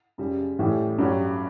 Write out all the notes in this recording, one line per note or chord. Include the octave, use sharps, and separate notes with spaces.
F#2 C#3 G3
A2 E3 G3
G2 F#3 C#4 G4